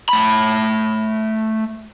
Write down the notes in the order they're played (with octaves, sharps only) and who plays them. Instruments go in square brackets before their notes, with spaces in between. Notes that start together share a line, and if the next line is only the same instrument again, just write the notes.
[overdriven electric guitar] A3 B5